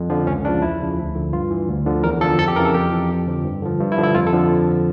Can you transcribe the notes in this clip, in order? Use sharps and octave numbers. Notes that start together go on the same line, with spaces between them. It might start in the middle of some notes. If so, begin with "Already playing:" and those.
Already playing: F2
D3 F3
C#2 C#4
C#3 F3 D4
E2 E4
C#3 F3
D2
D3 F3
G2 F4
E3
D2
D3 F3
E2 A#4
D3 F3 A4
F2 A4
G4
C#3 E3 A#4
A4
F2 G4
E3
F2
D3 F3
G2
D3 F3
G2
E4
D3 F3
E4
F2 F4
A4
D3 F3